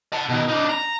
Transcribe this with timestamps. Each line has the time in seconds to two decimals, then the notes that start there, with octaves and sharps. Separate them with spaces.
0.13 F#5 A5
0.29 B2 D#3
0.48 D4 D#4
0.69 A#5